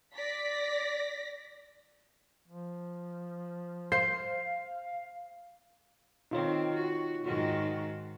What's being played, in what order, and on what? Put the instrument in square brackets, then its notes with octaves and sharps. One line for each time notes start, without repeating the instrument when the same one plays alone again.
[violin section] D5 A#6 B6
[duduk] F3
[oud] C5 [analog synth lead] F5 [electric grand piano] C7
[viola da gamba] D#3 C4 [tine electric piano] D#4 F4 C#5
[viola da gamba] F#4
G#2 D#3 F#4